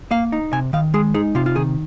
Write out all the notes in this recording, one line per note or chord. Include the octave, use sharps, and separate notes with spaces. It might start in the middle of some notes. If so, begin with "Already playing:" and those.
A#3 F5
D#4
C3 G#5
D#3 F5
G#3 G#4
D#4 G#4
C3 F4
F4
D#3 G#4